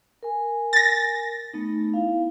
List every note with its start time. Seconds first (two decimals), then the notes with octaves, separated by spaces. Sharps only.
0.23 A#4 G#5
0.73 A6 A#6
1.53 A3 B3 D#4
1.94 E4 F5